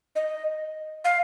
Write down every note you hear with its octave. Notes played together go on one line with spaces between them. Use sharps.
D#5
F5